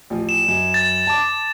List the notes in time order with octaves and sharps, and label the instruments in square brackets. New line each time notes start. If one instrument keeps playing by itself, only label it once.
[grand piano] A1 F3
[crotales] E7
[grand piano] F#2
[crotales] A6
[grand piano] A5 D6